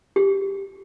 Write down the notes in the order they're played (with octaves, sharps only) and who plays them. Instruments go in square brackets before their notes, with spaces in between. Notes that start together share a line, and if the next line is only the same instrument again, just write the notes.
[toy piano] G4